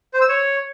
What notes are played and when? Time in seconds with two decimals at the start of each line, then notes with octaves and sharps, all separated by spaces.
0.14 C5
0.21 E6
0.28 C#5